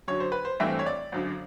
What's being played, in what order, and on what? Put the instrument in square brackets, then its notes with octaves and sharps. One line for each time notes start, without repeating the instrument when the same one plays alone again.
[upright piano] F#2 D3 F#3 C#5
C5
B4
C5
G#1 G2 E3 A3 C4 E5
C#5
D5
G#1 F#2 D3